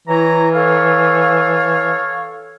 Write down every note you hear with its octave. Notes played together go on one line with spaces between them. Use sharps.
E3 E4 C#5 A#5
A4 C#5 F5